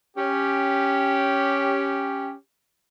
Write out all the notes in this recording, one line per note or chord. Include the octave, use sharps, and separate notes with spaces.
C#4 G4